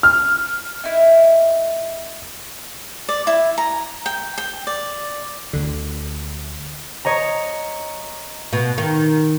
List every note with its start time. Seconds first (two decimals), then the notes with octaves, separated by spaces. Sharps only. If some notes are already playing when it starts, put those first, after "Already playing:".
0.03 F6
0.84 D#4 E4
3.09 D5
3.27 E4
3.58 A#5
4.06 G5
4.38 G5
4.67 D5
5.53 D2 D3
7.05 C#5 D#5 A#5
8.53 B2
8.78 D#3